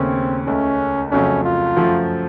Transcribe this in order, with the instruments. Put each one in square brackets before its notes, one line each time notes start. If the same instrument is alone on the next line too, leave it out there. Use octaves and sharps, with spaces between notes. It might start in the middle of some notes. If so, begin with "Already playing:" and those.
Already playing: [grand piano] D#2 C#3 A3 C#4 [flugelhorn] C4
[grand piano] C#2 C#3 A3 [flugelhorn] C#4
[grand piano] F2 C#3 F#3 A3 [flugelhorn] C#4
[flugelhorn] F4
[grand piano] F#2 F3 A3